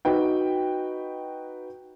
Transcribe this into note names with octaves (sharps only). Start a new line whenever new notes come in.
D#4 F#4 B4 G5